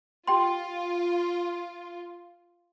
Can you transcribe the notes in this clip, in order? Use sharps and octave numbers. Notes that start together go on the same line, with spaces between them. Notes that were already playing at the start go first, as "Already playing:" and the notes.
F4 G4 G5 C6